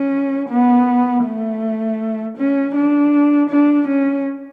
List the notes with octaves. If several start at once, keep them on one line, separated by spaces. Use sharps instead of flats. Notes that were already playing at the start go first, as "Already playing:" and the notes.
Already playing: C#4
B3
A3
C#4
D4
D4
C#4